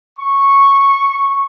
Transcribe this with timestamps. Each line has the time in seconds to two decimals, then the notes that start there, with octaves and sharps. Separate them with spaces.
0.19 C#6